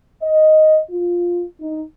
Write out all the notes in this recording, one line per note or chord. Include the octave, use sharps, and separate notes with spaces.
D#5
F4
D#4